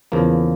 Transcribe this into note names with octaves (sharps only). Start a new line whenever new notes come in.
E2 C#3 F3 A#3